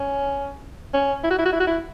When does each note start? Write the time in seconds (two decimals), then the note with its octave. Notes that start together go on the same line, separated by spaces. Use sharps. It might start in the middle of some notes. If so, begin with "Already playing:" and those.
Already playing: C#4
0.93 C#4
1.24 E4
1.30 F#4
1.39 E4
1.45 F#4
1.53 E4
1.60 F#4
1.67 E4